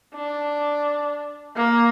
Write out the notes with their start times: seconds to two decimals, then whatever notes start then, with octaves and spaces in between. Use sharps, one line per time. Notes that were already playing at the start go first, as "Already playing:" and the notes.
0.15 D4
1.56 A#3